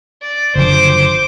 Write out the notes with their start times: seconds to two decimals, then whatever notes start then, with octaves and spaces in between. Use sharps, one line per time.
0.22 D5
0.55 F#1 D3 F3 C5 D6